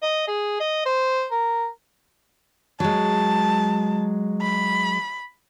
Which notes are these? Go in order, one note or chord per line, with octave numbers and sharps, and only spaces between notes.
D#5
G#4
D#5
C5
A#4
F#3 G#3 A5
B5